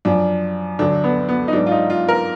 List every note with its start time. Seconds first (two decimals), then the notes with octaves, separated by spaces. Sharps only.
0.05 F#2 F3 D4
0.79 D2 D3 F#3 D4
1.04 B3
1.29 B3
1.48 D#4
1.53 G#2 F#3 D4
1.66 F4
1.71 D#4
1.90 F4
2.09 A#4